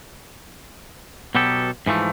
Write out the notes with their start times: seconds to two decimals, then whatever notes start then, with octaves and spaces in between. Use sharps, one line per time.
1.35 B2 F#3 B3 G4 A4
1.86 G#2 E3 F3 A3